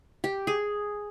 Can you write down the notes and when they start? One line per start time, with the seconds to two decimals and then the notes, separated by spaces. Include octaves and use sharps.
0.24 G4
0.47 G#4